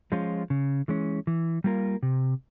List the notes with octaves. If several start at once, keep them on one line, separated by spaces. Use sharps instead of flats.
F3 G#3 C#4 F4
C#3
E3 G#3 C#4
E3
G3 A#3 F4 A#4
C3